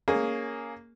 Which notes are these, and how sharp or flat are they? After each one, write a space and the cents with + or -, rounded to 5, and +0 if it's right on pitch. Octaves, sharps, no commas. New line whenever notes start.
A#3 +0 C#4 +15 G#4 +0